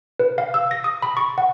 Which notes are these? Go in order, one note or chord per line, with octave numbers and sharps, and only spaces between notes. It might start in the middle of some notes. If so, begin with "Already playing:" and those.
B4
F5
E6
A#6
D#6
B5
C#6
F#5